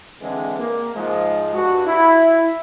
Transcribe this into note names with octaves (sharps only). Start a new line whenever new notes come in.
D3 E3 G#3 C4
A#3
G#2 F3 G#3
G2 F#4
E4